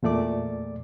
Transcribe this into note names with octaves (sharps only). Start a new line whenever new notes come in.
E2 A#2 A3 D5 D6